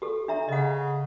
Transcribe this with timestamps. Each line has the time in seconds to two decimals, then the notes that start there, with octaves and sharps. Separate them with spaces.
0.02 G4 A4
0.28 D4 E5 A#5
0.49 C#3 D#5 F#5